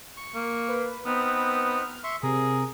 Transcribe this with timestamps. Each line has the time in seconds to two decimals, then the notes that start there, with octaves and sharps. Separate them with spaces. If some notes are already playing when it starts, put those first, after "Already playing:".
0.17 C#6
0.35 A#3
0.69 B4
1.06 B3 C4 D#4 B4 F6
2.04 E5 C6 C#6
2.23 C3 G#4 A#4